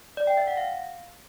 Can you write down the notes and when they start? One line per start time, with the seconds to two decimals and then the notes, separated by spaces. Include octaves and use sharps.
0.17 D5
0.27 G5
0.37 E5
0.47 F#5
0.57 F5